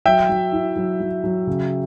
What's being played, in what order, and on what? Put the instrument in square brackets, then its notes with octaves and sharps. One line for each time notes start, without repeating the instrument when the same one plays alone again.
[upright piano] F#3 [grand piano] E5 G5
[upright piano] F#3
E4
F#3
F#3
F#3
C#3